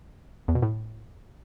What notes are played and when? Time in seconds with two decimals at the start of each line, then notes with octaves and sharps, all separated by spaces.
0.48 E2
0.55 B2
0.62 A2